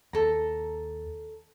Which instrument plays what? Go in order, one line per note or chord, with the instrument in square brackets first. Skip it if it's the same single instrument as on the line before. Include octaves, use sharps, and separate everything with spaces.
[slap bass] D#2 [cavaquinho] A4 A#5